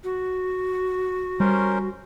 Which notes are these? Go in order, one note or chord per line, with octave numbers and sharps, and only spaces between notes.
F#4
G3 C#4 A#4 C5